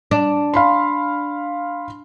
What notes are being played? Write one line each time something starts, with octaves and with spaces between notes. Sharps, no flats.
D4
F5 B5 C6